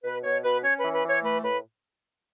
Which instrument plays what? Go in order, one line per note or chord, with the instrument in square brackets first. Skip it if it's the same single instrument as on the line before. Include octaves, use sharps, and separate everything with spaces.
[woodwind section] B2 B4
B2 C#5
B2 B4
C#4 C#5
E3 B4
B4
E3 C#5
A3 B4
A2 B4